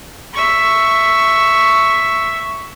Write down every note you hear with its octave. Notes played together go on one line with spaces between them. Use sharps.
E5 C#6